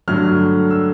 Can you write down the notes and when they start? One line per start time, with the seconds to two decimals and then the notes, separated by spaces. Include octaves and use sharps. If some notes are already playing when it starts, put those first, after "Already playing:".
0.08 G2 D3 F#3 A3 F6
0.70 E6